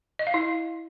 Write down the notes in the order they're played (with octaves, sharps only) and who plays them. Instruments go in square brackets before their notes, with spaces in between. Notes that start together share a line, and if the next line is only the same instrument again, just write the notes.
[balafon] D#5
F5
E4